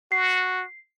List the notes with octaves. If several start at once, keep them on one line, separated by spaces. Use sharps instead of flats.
F#4 C7